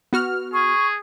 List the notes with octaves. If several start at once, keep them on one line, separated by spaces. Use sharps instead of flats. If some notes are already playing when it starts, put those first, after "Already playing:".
B3 F#4 F6
G#4 C#6